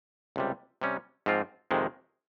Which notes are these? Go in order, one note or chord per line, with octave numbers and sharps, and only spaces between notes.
C#2 C3 G3
C3 G3 C#4
G#2 F3 C4 F4
F2 C3 D#3 G#3